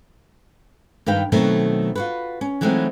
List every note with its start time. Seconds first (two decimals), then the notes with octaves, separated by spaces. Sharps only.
1.06 G2 D#3 B4 F5 G5
1.32 B2 D#3 F#3 A3 C4
1.95 F4 F#4 B4
2.41 C#4
2.61 E3 F#3 G#3 A3 C4 D#4